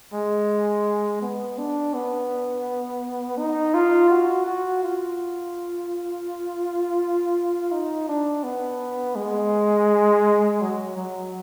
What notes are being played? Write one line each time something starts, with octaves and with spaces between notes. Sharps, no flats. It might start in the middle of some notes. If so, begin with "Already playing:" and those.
G#3
B3
D4
B3
D#4
F4
F#4
F#4
F4
D#4
D4
B3
G#3
F#3
F#3